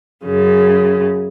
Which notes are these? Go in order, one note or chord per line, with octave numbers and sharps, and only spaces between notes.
F#2 C#3